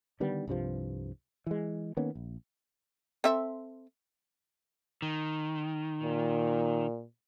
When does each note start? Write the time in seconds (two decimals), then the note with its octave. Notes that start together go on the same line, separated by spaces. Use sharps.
0.20 D3 D#3 G3 B3
0.47 C2 G2 C3 F3
1.46 E3 G#3
1.97 D#3 A#3 B3 C#4
2.15 A#1
3.24 C4 A4 E5
5.02 D#3
6.03 A#2